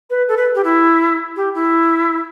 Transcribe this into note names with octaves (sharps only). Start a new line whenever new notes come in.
B4
A4
B4
G4
E4
G4
E4